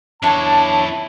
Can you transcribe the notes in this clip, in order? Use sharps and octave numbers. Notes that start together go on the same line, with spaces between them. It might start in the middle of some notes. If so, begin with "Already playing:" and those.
F2 D4 E4 C#5 A5